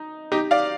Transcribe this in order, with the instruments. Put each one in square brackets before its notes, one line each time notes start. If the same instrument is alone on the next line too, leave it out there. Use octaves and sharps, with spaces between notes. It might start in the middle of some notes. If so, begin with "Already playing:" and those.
Already playing: [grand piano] D#4
D#4 G4
D5 F5